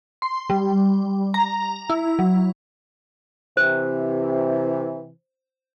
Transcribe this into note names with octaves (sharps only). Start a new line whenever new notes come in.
C6
G3
A#5
E4
F#3
C3 E3 C5